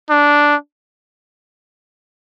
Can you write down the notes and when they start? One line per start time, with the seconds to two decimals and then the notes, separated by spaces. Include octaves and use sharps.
0.10 D4